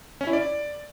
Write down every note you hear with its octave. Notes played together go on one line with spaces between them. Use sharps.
C#4
E4
D5